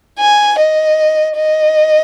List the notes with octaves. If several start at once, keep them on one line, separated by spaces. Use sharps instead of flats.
G#5
D#5
D#5